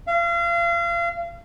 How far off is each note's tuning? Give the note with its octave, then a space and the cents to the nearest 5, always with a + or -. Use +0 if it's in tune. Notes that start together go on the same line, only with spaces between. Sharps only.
F5 -35